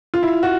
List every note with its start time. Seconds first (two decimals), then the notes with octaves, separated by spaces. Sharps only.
0.14 F4
0.23 E4
0.43 F#4